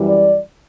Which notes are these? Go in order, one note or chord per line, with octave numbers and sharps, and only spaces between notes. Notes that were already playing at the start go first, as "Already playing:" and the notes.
Already playing: F#2 E3 G3
D5